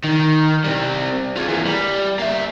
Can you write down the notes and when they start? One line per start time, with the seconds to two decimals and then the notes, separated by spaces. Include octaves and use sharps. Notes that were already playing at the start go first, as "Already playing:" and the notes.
0.04 D#3
0.64 G3 C4
1.36 F4 G#4
1.48 E3 A#3
1.65 G3
2.19 A#3 E5